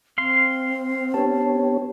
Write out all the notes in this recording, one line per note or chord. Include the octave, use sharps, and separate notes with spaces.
C4 F5 C6
B3 D4 G4 C#5 A5